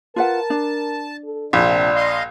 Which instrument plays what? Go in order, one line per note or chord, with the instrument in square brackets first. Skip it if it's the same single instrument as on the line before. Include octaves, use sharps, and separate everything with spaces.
[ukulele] F4 B4 F#5 [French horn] A#4 [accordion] A5
[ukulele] D4
[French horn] A4
[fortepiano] A#1 [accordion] C3 F3 [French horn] D5
[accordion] D#5 F5 C6